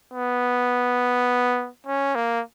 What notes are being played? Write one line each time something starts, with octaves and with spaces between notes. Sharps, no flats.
B3
C#4
A#3